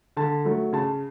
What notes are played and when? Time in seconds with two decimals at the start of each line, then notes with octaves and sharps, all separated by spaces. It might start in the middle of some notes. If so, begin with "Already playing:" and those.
0.17 D3 A5
0.45 F#3 A3
0.73 C#3 A5